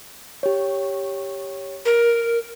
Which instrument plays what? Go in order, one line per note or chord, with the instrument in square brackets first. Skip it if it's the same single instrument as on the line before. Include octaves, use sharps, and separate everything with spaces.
[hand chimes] G4 C#5
[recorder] A#4